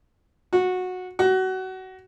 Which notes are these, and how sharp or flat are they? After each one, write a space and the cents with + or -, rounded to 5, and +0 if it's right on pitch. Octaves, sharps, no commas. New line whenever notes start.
F#4 -15
F#4 +25